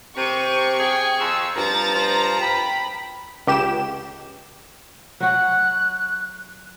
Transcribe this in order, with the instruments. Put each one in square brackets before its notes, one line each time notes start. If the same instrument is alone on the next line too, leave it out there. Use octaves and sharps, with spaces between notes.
[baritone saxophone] C3 [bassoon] C4 [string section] C#6 [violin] D#7
[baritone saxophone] G#4 [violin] G5
[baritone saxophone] F2 [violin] E6
[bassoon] G2 [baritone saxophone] F3 [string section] A#5 [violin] A6
[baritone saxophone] F3
[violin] G5 B5
[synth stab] C#2 G4 E7
[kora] F#3 F#4 [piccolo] F#6